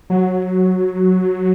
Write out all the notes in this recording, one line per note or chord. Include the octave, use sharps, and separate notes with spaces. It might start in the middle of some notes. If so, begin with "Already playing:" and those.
F#3